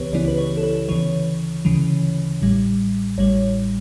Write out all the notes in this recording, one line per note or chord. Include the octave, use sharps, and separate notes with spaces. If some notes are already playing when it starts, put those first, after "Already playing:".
Already playing: C#2 C#3 E3 B3 G4 B4 C#5
C#2 C#3 E3 B3 E4 D5
B4
C#5
A4
B4
D2 C#3 E3 C#5
D2 C#3 E3
A1 A2 G3
A1 A2 G3 C#5